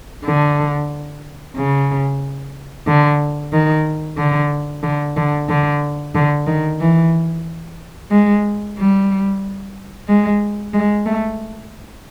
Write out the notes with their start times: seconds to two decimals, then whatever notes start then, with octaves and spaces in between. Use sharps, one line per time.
0.25 D3
1.55 C#3
2.87 D3
3.51 D#3
4.17 D3
4.82 D3
5.16 D3
5.48 D3
6.14 D3
6.47 D#3
6.80 E3
8.11 G#3
8.77 G3
10.07 G#3
10.73 G#3
11.05 A3